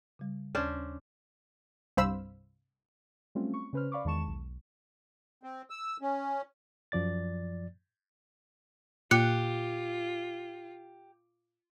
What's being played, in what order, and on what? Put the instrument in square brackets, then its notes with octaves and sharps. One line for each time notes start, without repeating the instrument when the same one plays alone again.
[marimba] C#3 G3
[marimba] D#2 [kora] C#4 D4 C5
[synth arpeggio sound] C2 G2 C5 F5 B5 E6
[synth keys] F#3 G3 A3 C4 C#4 F4
C#6
C#3 C#4 B4 C5 F6
D5 F5 B5 C#6 D6
E2 D#3 G#3 A5 C#6 E7
B1
[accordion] C4
E6
C#4
[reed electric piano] F#2 F3 D5 A6
[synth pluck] A#2 [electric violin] F4 [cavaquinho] G4 [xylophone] F#6 C#7